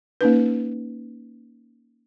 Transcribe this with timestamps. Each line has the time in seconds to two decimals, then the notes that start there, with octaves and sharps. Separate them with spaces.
0.21 A#3 C#4 D#4 B4